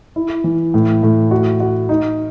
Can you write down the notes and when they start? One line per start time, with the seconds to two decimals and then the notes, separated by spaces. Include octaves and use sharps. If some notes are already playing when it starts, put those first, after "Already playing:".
0.16 E4
0.44 E3
0.74 A2
1.03 A2
1.31 F#4
1.60 F#4
1.89 D#4